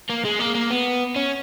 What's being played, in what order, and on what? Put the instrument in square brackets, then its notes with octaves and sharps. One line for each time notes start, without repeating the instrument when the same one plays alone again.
[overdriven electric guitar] A#3
G#3
A#3
A#3
B3
C#4